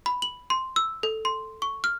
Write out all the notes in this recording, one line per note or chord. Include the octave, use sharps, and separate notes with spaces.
B5
F#7
C6
E6
A4
C6
C#6
F6